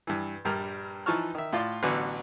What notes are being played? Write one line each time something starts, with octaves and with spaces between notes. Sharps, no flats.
G2 E3
A#1 G2 G3 A#4 F6
E3 F3 D#4 A5 C#6 F6
D#3 E5
A2 F4 D5 C6
A1 D3 F#3 B3 G#5